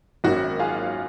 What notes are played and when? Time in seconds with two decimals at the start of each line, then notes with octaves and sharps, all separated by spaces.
0.24 G#1 F#2 D#3 A#3 C#4 F#4
0.60 F4 G#4